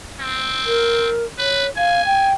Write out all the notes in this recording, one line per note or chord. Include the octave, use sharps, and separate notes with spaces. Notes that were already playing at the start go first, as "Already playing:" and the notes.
C4
A#4
B4 C#5
F5 G#5
G5